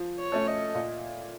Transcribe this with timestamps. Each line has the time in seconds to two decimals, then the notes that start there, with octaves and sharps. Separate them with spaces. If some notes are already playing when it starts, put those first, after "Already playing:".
Already playing: F3
0.19 C#5
0.32 A3 C#4 A4
0.47 D#5
0.74 A#2